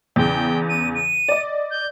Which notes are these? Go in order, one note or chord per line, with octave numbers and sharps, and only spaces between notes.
E2 C#3 G5
D#7
D#7
D5 D#5
G6